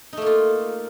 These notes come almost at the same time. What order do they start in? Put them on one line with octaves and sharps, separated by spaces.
D#4 A3 A#3 F4